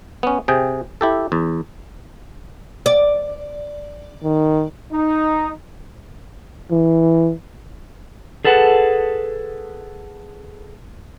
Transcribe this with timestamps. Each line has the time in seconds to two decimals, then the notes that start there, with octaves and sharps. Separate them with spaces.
0.23 B3 C#4
0.48 C3 G#4 G5
1.01 E4 G4 A4
1.32 E2
2.86 D5
4.24 D#3
4.92 D#4
6.71 E3
8.45 G#4 A4 B4 F#5 A5